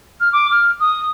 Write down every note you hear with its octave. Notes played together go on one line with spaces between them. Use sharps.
F6
D6
F6
D#6